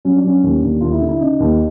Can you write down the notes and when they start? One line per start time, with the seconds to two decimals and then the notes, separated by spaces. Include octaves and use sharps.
0.05 F#3 C#4
0.16 D4
0.24 F#3 C#4
0.43 D#2
0.62 D#2 D4
0.81 D#2 F4
0.92 E4
1.01 D3
1.09 E4
1.21 C#3 D#4
1.40 D#2